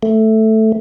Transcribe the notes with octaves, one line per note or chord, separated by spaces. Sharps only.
A3